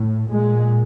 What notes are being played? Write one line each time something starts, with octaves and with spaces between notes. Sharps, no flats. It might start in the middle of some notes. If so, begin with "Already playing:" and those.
Already playing: A2
A#2 G#3